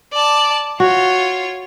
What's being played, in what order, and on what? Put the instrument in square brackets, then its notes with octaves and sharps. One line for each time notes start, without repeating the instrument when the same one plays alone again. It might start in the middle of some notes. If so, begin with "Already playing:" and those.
[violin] D5 A5
[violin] F4 C#5 [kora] F#4